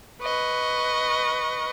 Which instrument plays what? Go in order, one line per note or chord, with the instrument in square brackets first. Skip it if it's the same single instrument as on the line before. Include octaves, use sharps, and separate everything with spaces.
[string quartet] B4 D#5 C#6